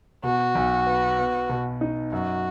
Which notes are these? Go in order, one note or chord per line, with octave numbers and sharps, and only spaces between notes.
B2 F#4
B1
B3
B3
B2
D#4
F#2 F#4